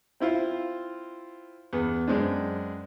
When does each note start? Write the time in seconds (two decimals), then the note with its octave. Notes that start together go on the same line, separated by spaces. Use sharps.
0.20 C4 E4 F4 C5
1.73 E2 B3
2.08 F#2 G#3 C4 D4